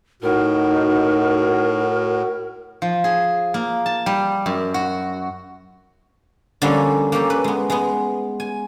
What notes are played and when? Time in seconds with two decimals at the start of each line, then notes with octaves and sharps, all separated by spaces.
0.22 A2 D#4 F#4 A#4
2.82 F3
3.04 G#4
3.54 A#3
3.86 A5
4.06 G3
4.46 F#2
4.74 F#4
6.62 D3 F3 G3 A#3 C#4 A4
7.12 A#3 C#4 G4 A4
7.30 B4
7.44 G#3 B3
7.70 G#3 B3
8.40 G#5